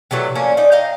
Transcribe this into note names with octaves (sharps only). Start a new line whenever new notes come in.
C3 E3 F#3 A3
F3 A#3 C#4 D4
D#4 D5
D#5 F5 G5 A#5